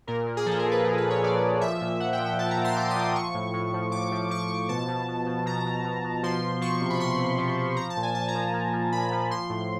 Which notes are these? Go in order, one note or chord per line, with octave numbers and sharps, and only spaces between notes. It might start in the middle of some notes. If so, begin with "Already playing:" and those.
A#2 A#4
A#2
G#4
F3 A4
A#4
A#2
B4
F3 A#4
B4
A#2
C#5
F3 D5
F3
F3 E5
A#2
A#2 F#5
G5
F3
G5
F3 A5
A#5
A#2
C6
F3 D6
D#6
F3
D#6
F3 C#6
A2
A2
F3
A2 D6
F3
F3 C#6
F3
B2 A5
B2
B2
B2
B2 A#5
B2
B2
B2
F3 C6
F3
F3 C#6
C3
B5
C3 C6
C3
F3
F3
F3 A#5
A5
A#2
G#5
A#2 A5
A#5
F3
A#5
F3
F3
A#2 B5
F3
F3 C6
A2